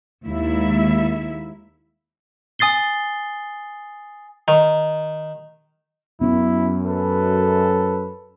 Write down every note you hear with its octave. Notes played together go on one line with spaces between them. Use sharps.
D#2 G#3 E4 E5
G#5 D#6 A6 C7 G7
D#3
F#2 B3 C#4 E4
A4 B4